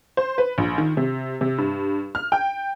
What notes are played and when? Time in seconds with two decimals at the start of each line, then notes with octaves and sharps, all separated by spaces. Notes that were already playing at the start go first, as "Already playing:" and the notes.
0.17 C5
0.38 B4
0.58 A#1
0.78 D#3
0.97 C3
1.41 C3
1.58 G2
2.15 F6
2.32 G5